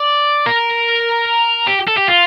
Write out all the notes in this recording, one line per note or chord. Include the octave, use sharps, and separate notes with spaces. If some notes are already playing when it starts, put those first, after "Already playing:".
Already playing: D5
A#4
G4
A4
G4
F4